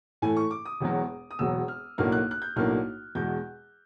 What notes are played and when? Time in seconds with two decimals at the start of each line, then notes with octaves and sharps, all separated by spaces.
0.22 A2 E3 A3 G#5
0.37 C#6
0.51 D6
0.65 D#6
0.80 E1 E2 B2 F#3
1.31 D#6
1.39 E1 E2 B2 F#3 E6
1.68 F6
1.98 B1 A2 F#3 A#3 D4 F6
2.12 F#6
2.31 F#6
2.42 G6
2.56 B1 A2 F#3 A#3 D4 F6
3.15 E2 B2 G#3 G6